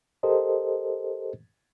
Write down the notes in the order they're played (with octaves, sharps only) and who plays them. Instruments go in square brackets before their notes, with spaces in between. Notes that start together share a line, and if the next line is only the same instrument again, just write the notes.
[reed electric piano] G4 A4 A#4 C5 D#5